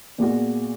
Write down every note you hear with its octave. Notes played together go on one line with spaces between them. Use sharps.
A#2 G#3 B3 F#4